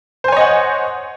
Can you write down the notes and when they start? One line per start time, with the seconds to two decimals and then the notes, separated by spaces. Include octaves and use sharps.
0.24 C5
0.28 G#5
0.32 C#5
0.36 D#5
0.41 F#5